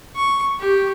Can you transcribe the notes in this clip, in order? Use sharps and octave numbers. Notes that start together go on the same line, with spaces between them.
C#6
G4